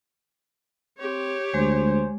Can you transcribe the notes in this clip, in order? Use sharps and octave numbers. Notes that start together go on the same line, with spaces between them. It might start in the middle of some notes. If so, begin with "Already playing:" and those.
C4 G4 C#5
D2 G#3 C5